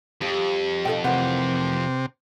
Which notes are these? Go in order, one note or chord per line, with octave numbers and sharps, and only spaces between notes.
F2 F3 G3 G4
B2 D#4 F4 A4 G5
C3 D#3 E3 A3 B4 F#5